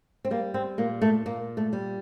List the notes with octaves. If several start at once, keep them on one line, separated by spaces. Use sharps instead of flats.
C4
G3 A#3
C4
A#2 A#3
A3
A#2 A#3
A3
G3